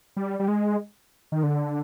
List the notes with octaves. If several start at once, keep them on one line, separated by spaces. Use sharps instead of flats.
G3
G3
G#3
D#3
D3